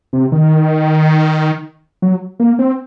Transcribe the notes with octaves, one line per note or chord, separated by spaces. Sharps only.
C3
D#3
F#3
A#3
C4